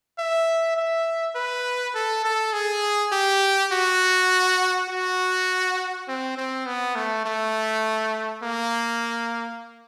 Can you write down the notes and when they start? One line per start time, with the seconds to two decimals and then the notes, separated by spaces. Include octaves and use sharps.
0.18 E5
0.77 E5
1.35 B4
1.95 A4
2.25 A4
2.53 G#4
3.12 G4
3.72 F#4
4.89 F#4
6.08 C4
6.38 C4
6.66 B3
6.95 A3
7.25 A3
8.43 A#3